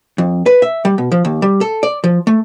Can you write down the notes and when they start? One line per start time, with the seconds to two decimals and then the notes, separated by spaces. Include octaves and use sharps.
0.18 F2
0.46 B4
0.62 E5
0.85 G3
0.98 B2
1.12 F3
1.25 D#2
1.42 G3
1.61 A4
1.83 D5
2.04 F3
2.27 A3